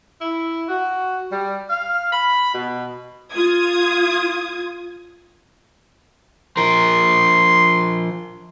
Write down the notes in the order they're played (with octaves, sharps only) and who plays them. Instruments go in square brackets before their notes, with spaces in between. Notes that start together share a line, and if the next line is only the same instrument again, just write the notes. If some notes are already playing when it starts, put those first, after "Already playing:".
[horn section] E4
F#4
G3
F5
B5
B2
[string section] F4 D#6 G#6
[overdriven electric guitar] F3 A#4 [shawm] C6